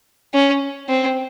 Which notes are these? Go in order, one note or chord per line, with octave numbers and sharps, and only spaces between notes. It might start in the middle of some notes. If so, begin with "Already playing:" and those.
C#4
C4